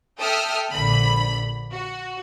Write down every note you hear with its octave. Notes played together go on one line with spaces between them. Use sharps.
A4 E5 G5 D#6 F6
A#1 D3 B5
F#4